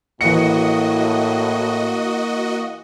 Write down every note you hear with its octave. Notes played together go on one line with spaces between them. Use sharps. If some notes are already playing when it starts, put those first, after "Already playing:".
A2 E3 A#3 F#4 D#5 C#7